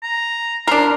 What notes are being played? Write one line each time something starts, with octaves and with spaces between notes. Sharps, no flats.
A#5
D4 A#4 C6